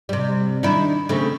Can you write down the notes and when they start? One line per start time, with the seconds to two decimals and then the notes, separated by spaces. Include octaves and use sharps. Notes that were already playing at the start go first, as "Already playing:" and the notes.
0.09 C3 G3
0.63 D#3 D4 E4
1.09 C#3 A3 C4